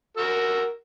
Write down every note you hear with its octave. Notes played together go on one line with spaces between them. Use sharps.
F#4 A#4 E6